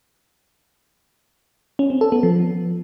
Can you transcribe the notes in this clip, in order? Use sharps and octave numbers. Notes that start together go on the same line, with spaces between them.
C#4
C4
A4
B3
F3